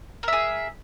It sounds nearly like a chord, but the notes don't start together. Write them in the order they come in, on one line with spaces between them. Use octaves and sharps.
A#4 E5 G#4